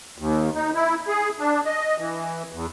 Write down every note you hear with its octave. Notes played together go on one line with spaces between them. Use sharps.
D#2
D#4
E4
G#4
D4
D#5
E3
E2